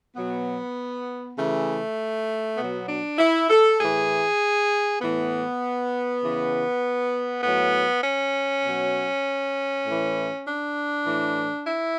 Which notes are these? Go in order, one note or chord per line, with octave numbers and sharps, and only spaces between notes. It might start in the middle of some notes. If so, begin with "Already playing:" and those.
B2 F#3 B3
C#3 E3 A3
B2 F#3 B3
D4
E4
A4
A2 E3 G#4
A2 E3 B3
C#3 E3
A2 F#3 B3
C#4
B2 F#3
A2 E3
D4
A2 E3
E4